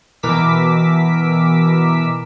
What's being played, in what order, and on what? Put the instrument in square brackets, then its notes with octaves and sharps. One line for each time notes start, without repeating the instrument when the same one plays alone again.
[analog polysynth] B2 E3 A#4 D6 E6 B6